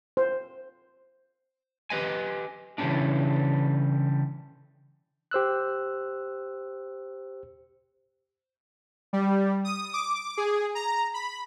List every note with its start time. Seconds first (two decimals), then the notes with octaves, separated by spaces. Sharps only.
0.17 C5
1.90 G4 B4 D#5 G#5
2.78 C#3 E3 F#3 G3 C#4 D4
5.31 G4 C5 E6 F#6
9.13 G3
9.65 D#6
9.93 D6
10.37 G#4
10.75 A#5
11.14 B5